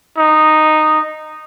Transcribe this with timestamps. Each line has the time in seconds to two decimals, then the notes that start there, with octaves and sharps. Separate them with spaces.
0.18 D#4